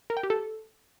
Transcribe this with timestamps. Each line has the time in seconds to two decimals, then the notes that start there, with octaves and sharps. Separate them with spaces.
0.10 A#4
0.17 G5
0.23 G4
0.30 A4